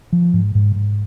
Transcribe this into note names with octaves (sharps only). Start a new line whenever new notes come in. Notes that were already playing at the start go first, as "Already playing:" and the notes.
F3
G#2
G#2
G#2